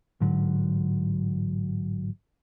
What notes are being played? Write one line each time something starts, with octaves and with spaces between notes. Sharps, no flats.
A1 G#2 D3 F#3